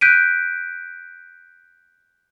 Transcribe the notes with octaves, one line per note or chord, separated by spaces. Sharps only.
F#6 G6 B6 D7 D#7